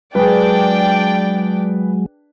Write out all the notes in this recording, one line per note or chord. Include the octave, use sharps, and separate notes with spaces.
F#3 G#3 D4 G#4 B4 D5 G5